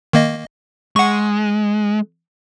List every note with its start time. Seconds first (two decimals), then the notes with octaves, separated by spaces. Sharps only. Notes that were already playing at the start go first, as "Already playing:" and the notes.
0.13 D#3 A#3 D#5
0.96 G#3 F#5 C#6